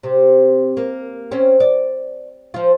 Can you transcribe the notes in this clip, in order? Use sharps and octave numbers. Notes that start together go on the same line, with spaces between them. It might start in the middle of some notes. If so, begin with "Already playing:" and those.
C3
A#3
C4 C#4
D5
F3 F4